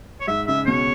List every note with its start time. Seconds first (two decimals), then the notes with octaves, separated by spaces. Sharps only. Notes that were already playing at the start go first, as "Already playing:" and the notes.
0.21 C#5
0.27 G#2 E5
0.47 C#3 E5
0.67 B2 C#5